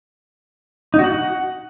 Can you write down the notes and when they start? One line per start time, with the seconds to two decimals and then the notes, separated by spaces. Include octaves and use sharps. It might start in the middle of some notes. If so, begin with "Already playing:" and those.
0.94 D#4
0.99 F#4
1.04 F#5